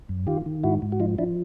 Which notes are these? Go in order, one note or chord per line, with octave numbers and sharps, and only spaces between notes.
F#2
D#3 F4 G4
D#3
G#2 E4 F#4
G#2
F#4
F3 D#4 F4
F3 D4 E4